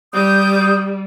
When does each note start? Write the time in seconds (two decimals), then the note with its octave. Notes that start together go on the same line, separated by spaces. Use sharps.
0.14 G3 D#6 G6